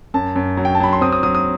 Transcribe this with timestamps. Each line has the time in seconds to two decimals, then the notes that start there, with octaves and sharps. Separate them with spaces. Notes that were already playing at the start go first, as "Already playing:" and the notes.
0.14 F#2 A5
0.36 F#2
0.57 F#3
0.65 G5
0.75 A5
0.80 F#3 B5
0.93 C6
1.01 C4 D#6
1.12 D#6
1.23 F#3 D#6
1.35 D#6